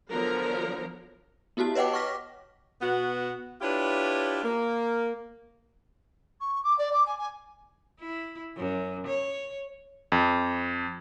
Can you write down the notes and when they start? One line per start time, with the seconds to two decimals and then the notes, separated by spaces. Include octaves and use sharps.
0.11 D3 F3 F#3 B3 A#4 A#5
1.57 B3 E4 F#4 G4 A5
1.75 B4 C#5 D#5 F#5 G5 D6
1.93 C#6 D6 F6 A#6 B6
2.81 B2 B3 F#4
3.61 D4 E4 F4 G4 B4 C#5
4.44 A#3
6.40 C#6
6.63 D6
6.78 D5
6.92 D6
7.06 G#5
7.18 G#5
8.00 E4
8.57 F#2
9.07 C#5
10.12 F2